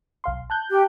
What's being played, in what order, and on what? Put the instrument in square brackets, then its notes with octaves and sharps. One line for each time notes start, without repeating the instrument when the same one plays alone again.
[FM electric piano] B1 F5 C6
A5 F#6 G6
[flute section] G4